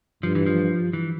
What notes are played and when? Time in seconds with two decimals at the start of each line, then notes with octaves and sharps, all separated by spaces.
0.23 G2 F3
0.35 E3
0.46 F3
0.93 E3